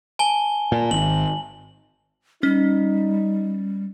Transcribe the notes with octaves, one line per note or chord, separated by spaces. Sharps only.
G#5 A5 G7
A#2
G#1 F#7
G3 C#4 D#4